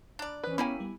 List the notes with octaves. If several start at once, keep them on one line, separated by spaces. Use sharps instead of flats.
D4 D5 A#5 B5 F6
E3 C#4 B4 C5 D#6
E3 A#3 B3 E4 G4 G#5
G3 B3